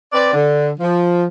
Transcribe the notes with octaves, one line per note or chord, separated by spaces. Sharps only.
C4 B4 D5
D3
F3